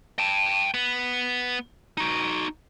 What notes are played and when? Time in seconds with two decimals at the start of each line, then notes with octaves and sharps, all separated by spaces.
0.19 G5 A5
0.74 B3
1.97 D#4 F#4